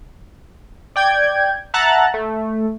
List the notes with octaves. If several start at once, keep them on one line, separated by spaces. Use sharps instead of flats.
D5 G5 G6 G#6
E5 F#5 A5 A#5 F#6 A6
A3